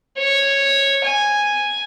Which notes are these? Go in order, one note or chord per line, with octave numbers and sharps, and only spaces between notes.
C#5
G#5